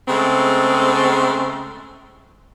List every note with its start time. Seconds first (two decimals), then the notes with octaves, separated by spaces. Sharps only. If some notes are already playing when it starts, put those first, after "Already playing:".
0.08 C#3 G#3 A3 C4